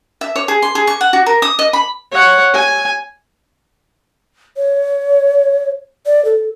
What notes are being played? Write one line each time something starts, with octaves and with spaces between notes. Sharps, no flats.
E5
C#5
G#4
C6
G#4
C#6
F#5
F#4
A#4
D#6
D#5
B5
C#5 F#5
G#5
C#5
D5
A4